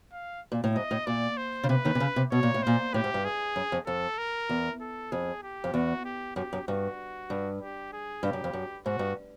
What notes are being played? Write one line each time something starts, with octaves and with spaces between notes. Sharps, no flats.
F5
A#2
A2
G#2 D#5
A2
A#2 D5
C5
C#3
C3 B4
D#2 D#3
C3
C#3
C3
B2 C#5
A#2
A2
A#2 C5
A2 G4
G#2
G2
G#4
F#2
F2
F2 A4
A#4
E2
A4
F2 G#4
G4
F2
E2 F#4
G4
F#2 G4
F#2
G2 F#4
G2
G4
G#4
G2 G4
F#2
F2
F#2
G#2 F#4
G2